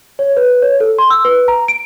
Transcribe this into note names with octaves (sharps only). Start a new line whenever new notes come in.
C#5
B4
C#5
A4
C6
E6
B4
A#5
D7